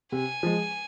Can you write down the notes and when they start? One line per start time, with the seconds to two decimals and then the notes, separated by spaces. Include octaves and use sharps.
0.12 C3 G#5
0.43 F3 G#3